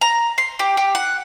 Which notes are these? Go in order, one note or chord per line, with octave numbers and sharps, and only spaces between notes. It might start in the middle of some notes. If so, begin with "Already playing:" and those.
A#5
C6
G4
G4
F#5